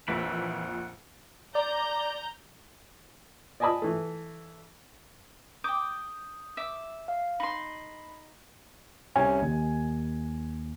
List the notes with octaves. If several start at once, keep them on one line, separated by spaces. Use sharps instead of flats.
A#1 F2 A#2 E3 E4 B4 F#5
D5 A#5 G6
D5 D#5 G#5 A5 B5 D#6
E3 A3
G5 D6 D#6 G6
E5 D6
F5
D#4 B5 C6
C2 C3 C#4 G#5
D#2